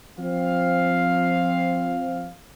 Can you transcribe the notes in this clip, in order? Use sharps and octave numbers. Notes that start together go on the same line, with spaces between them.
F3 C4 F5